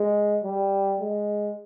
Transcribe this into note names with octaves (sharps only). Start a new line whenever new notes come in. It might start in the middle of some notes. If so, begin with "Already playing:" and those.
Already playing: G#3
G3
G#3